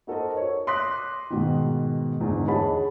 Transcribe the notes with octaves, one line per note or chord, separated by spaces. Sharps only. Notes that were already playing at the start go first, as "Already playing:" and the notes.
D#4 F#4 A4 A#4 C5 D#5
C#5
C6 D6 D#6 F#6 A#6 B6
G#2 B2 D#3
E2 G#2 D3
G#4 C#5 D#5 F#5 A5 B5